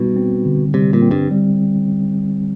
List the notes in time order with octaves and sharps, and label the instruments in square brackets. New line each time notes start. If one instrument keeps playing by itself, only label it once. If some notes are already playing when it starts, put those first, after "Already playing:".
Already playing: [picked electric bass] B2 [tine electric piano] G3 D#4
[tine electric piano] C4
D3
[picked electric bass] C3 [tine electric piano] G3
[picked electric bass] A#2
[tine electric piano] C4
[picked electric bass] G2
[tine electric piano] G3